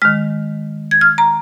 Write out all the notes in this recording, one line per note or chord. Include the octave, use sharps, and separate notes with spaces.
D#3 G#3 F6
G#6
F6
A#5